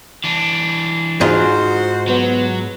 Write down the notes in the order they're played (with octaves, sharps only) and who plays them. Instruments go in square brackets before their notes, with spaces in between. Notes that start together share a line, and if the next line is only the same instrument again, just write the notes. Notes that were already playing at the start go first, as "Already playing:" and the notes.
[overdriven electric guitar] E3 D4
[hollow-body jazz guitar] G#2 D#4 F4 [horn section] F#4 C5
[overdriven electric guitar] F#3 [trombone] B3